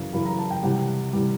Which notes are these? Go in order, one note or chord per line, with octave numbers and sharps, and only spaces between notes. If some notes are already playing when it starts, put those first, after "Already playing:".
Already playing: F#2 C#3 E3
F#2 C#3 E3 B5
A#5
A5
G5
C3 E3 G3 F#5
C3 E3 G3